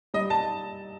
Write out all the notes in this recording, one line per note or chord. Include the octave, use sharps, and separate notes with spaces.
G3 D#5
A5